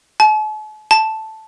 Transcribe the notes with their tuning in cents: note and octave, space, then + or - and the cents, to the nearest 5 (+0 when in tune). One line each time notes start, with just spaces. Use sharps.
A5 -45
A5 +0